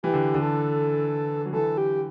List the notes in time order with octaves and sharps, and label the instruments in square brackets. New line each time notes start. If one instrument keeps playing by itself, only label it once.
[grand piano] E3 [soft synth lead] G4
[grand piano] D3
D3
[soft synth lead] A4
[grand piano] F#3
[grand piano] E3 [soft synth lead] A4
[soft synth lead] G4